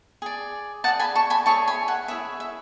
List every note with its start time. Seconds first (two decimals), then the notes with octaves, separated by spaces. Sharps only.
0.22 G#4 D5
0.84 G#4 D5 F#5 A5
0.99 G#5 B5
1.15 A5 C#6
1.30 G#5 B5
1.46 E4 G#4 C#5 A5 C#6
1.68 G#5 B5
1.88 F#5
2.08 E4 G#4 C#5 E5
2.40 E5